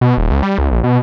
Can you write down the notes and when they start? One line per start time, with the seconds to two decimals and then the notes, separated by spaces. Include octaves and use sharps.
0.01 B2
0.18 D#1
0.31 C#2
0.43 G3
0.58 C#2
0.72 A#1
0.84 B2